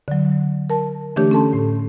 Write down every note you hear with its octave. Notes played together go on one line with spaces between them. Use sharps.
D3 F#3
A#4 A5
D3 E3 A3 D4 G4 C#5
C#4 A4 A5 C6
A2